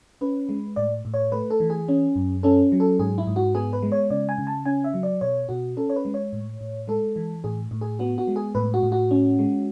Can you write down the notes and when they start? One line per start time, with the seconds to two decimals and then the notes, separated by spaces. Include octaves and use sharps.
0.21 C#4 B4
0.49 G#3
0.76 A2 D5
1.05 A2
1.14 C#5
1.32 A3 B4
1.50 A4
1.60 E3
1.70 G#4
1.88 C#4
2.16 F#2
2.43 C#4 A4
2.72 F#3
2.80 A4
2.99 G#2 G#4
3.18 E4
3.27 G#2
3.36 F#4
3.55 B3 G#4
3.73 B4
3.82 G#3
3.92 C#5
4.10 C#3 D5
4.29 G#5
4.38 C#3
4.47 A5
4.65 C#4 G#5
4.84 E5
4.94 F#3
5.03 D5
5.21 B2 C#5
5.49 B2 F#4
5.77 C#4 A4
5.90 C#5
5.96 B4
6.05 G#3
6.14 C#5
6.33 A2
6.61 A2
6.88 G#3 A4
7.16 E3
7.44 A2 G#4
7.71 A2
7.81 G#4
7.99 B3 F#4
8.18 F#4
8.27 G#3
8.36 G#4
8.55 A2 B4
8.74 F#4
8.83 A2
8.92 F#4
9.11 C#4
9.39 G#3